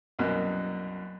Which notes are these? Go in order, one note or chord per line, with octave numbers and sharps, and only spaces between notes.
C2 F#2 B2 A#3